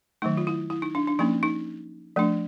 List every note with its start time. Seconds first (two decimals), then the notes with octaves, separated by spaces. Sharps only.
0.22 D#3 F#3 A3 D#4
0.37 F4
0.47 E4
0.70 E4
0.82 D#4
0.95 D4
1.07 D4
1.19 F3 A#3 C#4 D#4
1.43 D#4
2.16 F3 A3 D4